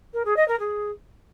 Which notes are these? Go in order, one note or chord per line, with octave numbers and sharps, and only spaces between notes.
A#4
G#4
D#5
A#4
G#4